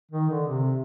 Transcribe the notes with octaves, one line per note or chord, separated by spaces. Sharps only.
D#3
D3
C3